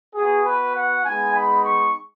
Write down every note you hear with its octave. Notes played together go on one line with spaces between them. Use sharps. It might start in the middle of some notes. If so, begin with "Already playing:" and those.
B3 F#4 G#4
B4
F#5
G#3 B3 D#4 G#5
B5
C#6